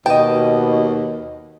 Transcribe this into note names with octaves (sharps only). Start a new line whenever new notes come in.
D#2 B2 D#5 G5 A5